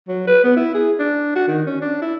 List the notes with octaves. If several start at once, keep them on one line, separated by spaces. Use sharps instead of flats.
F#3
B4
B3
E4
G#4
D4
F#4
D#3
C#4
D4
E4